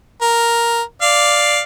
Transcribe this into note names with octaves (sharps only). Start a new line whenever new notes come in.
A#4
D5 F5